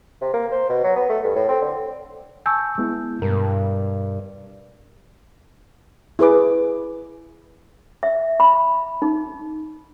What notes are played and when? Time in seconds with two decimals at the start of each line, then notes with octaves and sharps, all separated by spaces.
0.21 C3
0.33 A#3
0.51 C5
0.69 B2
0.84 F#3
0.96 B3
1.10 A3
1.24 G2
1.35 A2
1.49 C4
1.62 D3
2.46 G#5 A5 C#6 E6 G6
2.78 G#3 B3 E4
3.22 G2 B2 A#4
6.19 E4 G#4 B4 D6
8.03 E5
8.40 B5
9.02 D#4